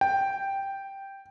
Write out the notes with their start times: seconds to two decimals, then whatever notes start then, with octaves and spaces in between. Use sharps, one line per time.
0.01 G5